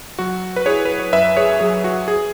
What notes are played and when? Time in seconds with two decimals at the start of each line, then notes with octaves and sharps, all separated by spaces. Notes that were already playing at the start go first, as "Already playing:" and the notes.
0.19 F#3 F#4
0.56 B4
0.66 E4 G#4 C#5
0.85 B4
0.99 C#5
1.13 F#2 B4 E5
1.37 G#4 C#5
1.60 F#3 G#4
1.84 F#4
2.08 G#4